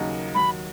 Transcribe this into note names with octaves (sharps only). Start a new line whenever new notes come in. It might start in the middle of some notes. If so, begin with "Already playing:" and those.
Already playing: D#2 C#3 F#3 A#3 D#4
D#2 D#3 F#3 B5